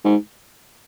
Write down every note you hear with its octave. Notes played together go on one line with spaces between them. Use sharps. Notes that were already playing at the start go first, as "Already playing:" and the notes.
G#2